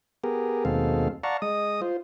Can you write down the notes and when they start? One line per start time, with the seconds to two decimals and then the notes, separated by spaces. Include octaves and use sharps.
0.24 B3 G4 G#4 A#4
0.65 D#2 B2 G#3 C4 A4 F5
1.23 D5 F5 F#5 A5 A#5 C#6
1.42 G#3 D#5 D#6
1.82 F4 C5